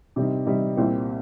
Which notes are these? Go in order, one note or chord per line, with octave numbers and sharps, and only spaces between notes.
C3 G3 C4 D#4
C3 G3 C4 D#4
C2 A#2 G3 C4